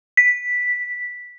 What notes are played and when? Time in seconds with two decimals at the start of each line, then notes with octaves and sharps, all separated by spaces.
0.17 B6